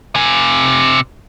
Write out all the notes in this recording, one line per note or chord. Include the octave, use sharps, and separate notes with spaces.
C3 G#5